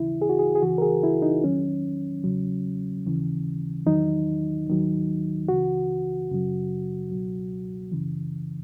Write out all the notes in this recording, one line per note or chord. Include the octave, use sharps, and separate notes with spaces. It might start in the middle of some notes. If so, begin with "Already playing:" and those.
Already playing: D#2 C#3 E3 E4
G#4
F#4
G#4
G#4
C#2 C#3 E3 F#4
A#4
G#4
E4
D#4
E2 D#3 F#3 C#4
E2 C#3 F#3
D#2 C#3 E3
E2 D#3 F#3 D#4
D#2 D#3 F#3
C#2 C#3 E3 F#4
F#2 C#3 F#3
C#2 B2 F#3
F#2 C#3 E3